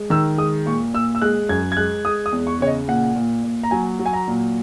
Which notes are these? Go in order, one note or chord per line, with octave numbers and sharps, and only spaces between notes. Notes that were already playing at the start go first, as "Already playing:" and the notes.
Already playing: G#3
D#3 E6
G#3 D#6
A#2 C#6
A#2 E6
E6
G#3 F#6
F#2 G#6
G#6
G#3 F#6
G#3 D#6
D#6
E2
C#6
C#3 C#5
D#5
A#2 F#5
A#2
A#2
A#5
F#3 G#5
F#3
G#5
A#5
A#2